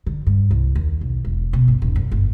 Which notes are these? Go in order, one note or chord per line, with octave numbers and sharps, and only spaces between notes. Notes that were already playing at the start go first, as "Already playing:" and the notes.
D3
G2
C2
D#2
B1
E1
B2
G1
D#1
F#2
G1